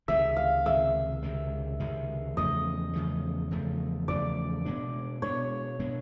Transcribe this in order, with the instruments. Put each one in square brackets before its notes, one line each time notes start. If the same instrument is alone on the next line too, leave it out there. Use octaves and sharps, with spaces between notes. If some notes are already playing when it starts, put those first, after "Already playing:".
[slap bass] C#2 C3 D#3 G#3 [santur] E5
[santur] F5
[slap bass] C#2 C3 D#3 G#3 [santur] E5
[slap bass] C#2 C3 D#3 G#3
C#2 C3 D#3 G#3
[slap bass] E2 C#3 F3 A3 [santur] D#5
[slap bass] E2 C#3 F3 A3
E2 C#3 F3 A3
[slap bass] E2 C#3 F3 A3 [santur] D5
[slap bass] B2 G#3 B3 D4
[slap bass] B2 G#3 B3 D4 [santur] C#5
[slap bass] B2 G#3 B3 D4